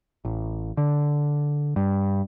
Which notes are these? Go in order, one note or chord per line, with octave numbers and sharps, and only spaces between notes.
A1
D3
G2